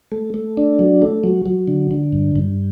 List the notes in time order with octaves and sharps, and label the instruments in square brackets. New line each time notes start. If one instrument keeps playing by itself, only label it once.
[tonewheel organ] A3
A3
D4
F#3
A3
F#3
F#3
D3
D3
G2
G2